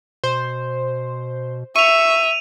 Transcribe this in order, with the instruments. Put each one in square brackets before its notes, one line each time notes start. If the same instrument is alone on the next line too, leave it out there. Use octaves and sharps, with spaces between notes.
[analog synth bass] B2 [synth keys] C5
[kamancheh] E5 [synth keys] C#6 [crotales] D#7 F7